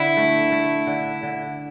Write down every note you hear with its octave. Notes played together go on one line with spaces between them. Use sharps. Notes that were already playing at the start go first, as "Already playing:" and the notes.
Already playing: D3 E4
A3
A3
D3
D3